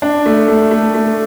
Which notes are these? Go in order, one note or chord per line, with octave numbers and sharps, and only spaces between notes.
D4
A3
A3
A3
A3